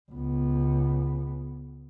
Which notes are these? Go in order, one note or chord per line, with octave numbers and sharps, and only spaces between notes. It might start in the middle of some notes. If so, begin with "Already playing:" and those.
C#2 B3